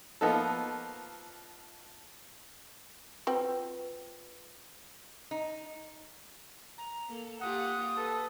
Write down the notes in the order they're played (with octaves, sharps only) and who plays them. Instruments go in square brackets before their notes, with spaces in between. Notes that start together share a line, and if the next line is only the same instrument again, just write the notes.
[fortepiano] F3 A#3 B3 D#4 A4
[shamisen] C4 F#4 G5 [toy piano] F4 B4
[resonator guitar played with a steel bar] D#4
[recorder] A#5
[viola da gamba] A#3 A4
[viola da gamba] A#3 F4 G4 [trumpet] F#5 [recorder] D#6
[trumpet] A4 [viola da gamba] B4